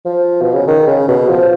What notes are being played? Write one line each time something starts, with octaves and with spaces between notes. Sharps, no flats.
F3
B2
C#3
D#3
C#3
B2
F3